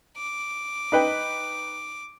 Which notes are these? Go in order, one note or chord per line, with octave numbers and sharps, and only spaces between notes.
D6
D#4 B4 G5